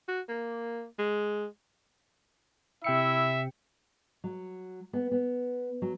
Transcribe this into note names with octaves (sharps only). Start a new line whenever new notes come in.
F#4
A#3
G#3
C3 E4 E5 G5 C#7
F#3
B3
B3
F#3